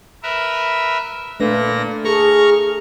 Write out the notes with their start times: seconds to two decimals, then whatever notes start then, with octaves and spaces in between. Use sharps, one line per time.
0.23 A#4 B4 E5
1.40 A#2 A3 A#3 D4 B4 A#6
2.05 G#4 A4 A#5 C#6 F6